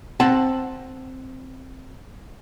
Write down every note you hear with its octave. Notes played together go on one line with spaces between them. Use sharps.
C4 F#5 A5 C6